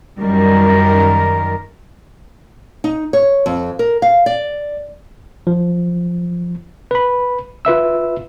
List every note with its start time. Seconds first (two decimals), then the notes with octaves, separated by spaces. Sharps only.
0.19 F#2 D#3 G3 A#4
2.84 D#4
3.13 C#5
3.46 F2
3.79 A#4
4.02 F5
4.26 D5
5.47 F3
6.91 B4 B5
7.65 F4 B4 E5 E6